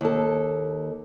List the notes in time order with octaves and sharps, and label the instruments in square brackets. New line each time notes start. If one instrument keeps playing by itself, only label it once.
[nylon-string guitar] D#2 A4